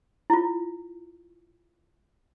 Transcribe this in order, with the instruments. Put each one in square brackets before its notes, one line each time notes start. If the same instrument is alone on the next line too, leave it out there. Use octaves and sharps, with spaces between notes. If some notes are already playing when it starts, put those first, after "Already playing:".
[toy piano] E4 F4